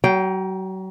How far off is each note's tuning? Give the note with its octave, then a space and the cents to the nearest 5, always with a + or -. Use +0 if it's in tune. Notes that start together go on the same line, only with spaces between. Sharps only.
F#3 +35 G5 +0